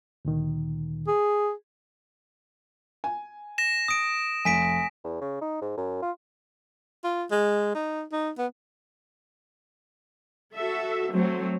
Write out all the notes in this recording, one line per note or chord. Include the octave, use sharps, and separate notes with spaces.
D2 A#2 D#3
G#4
G#5
A#6 E7
D#6 D7
F1 G#5 B6 D7
E2
C#3
D#4
G#2
F#2
F4
F4
G#3
D#4
D#4
B3
F#4 A4 E5
F#3 A3 C4